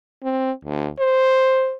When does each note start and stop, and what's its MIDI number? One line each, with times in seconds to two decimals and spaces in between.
0.23 0.51 60
0.65 0.87 38
1.00 1.76 72